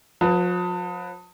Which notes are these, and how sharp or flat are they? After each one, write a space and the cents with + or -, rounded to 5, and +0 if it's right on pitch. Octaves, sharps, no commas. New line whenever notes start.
F3 +40 B4 +0